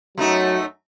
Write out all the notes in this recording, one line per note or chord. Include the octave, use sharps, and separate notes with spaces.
F#2 F#3 A3 D#4